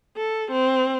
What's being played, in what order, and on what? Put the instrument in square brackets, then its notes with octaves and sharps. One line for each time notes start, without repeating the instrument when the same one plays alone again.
[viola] A4
C4